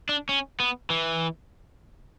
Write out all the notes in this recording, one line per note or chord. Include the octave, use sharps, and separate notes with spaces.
D4
C#4
B3
E3